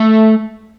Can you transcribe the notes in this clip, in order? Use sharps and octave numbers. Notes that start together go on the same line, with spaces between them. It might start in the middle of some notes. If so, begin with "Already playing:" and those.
Already playing: A3